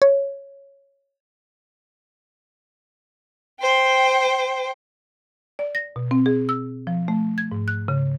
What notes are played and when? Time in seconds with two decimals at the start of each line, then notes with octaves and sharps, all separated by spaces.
0.02 C#5
3.60 C5 G5
5.59 D5
5.75 A#6
5.96 B2
6.11 C4
6.26 G#4
6.49 E6
6.87 F3
7.08 A3
7.38 G#6
7.51 G#2
7.68 F#6
7.88 C#3